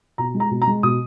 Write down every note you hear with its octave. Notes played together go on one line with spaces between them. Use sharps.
B2 A#5
G#3
A#5
B2
A#5
G#3
B2 D#6